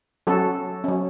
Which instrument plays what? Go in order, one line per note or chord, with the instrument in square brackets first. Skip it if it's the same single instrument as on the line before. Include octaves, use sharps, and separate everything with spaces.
[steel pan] F#3 C#4 F#4 A4
F#3 C#4